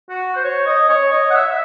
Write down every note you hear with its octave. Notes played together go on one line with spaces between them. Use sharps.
F#4
C5
C#5
D#5
C#5
D#5
F#5
E5
E5